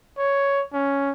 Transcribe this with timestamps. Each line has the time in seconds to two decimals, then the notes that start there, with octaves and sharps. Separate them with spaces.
0.18 C#5
0.73 C#4